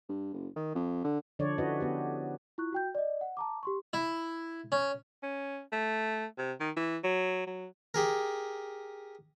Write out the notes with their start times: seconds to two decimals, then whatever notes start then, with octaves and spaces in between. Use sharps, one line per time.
0.09 G2
0.33 F#1
0.56 D#3
0.75 F2
1.04 D3
1.39 D3 F3 D4 C#5 D5
1.58 C#4 E4 F#4 B4 D#5
1.80 B3 F#4 G4
2.58 E4 F4 C#6 F#6
2.73 F#4 G5 G6
2.95 D5 D#5
3.21 F#5
3.37 A5 A#5 D6
3.63 G4 C6 C#6
3.93 E4
4.72 C#4
5.23 C#4
5.72 A3
6.38 C3
6.60 D#3
6.76 E3
7.04 F#3
7.47 F#3
7.94 G4 G#4 A#4